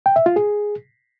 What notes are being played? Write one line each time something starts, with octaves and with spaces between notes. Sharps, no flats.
G5
E5
F4
G#4